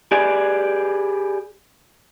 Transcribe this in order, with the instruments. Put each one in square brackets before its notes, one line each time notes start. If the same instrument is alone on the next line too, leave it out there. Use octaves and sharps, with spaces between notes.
[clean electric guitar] G4 G#4 B4 D5 G#5